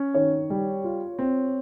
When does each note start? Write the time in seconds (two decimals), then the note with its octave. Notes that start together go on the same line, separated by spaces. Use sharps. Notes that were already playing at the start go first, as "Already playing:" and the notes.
Already playing: C#4
0.14 D#3 C#5
0.50 G3
0.84 F4
1.19 C4